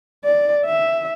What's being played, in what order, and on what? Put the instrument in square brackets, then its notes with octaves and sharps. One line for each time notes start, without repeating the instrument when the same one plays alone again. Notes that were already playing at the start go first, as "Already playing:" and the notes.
[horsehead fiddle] D5
E5